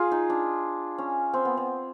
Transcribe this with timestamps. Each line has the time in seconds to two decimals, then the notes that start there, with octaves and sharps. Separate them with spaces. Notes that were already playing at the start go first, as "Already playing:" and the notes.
Already playing: F4 G#4
0.11 D#4
0.30 D4
0.98 C#4
1.34 C4
1.45 B3
1.57 C4